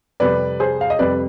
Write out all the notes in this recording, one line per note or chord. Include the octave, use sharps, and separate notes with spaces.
F2 C3 G3 B4 D5
G#4 C5
F5
D#5
F2 C3 G3 B4 D5